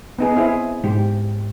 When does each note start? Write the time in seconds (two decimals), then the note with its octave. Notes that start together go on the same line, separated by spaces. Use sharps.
0.19 B3 D#4 G#4
0.36 C4 E4 G#4
0.84 G#2 G4